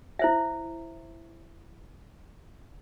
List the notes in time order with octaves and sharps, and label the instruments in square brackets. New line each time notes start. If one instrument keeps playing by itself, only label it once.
[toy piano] E4 C5 E5